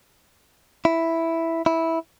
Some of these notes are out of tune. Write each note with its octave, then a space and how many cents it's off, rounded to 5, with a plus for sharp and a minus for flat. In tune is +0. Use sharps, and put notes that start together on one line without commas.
E4 +0
E4 -10